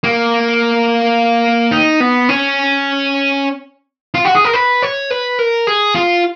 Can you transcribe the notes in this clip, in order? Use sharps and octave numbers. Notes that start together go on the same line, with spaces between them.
A#3
D#4
B3
C#4
F4
F#4
G#4
A#4
B4
C#5
B4
A#4
G#4
F4